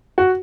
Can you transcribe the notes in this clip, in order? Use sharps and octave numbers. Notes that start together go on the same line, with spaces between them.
F#4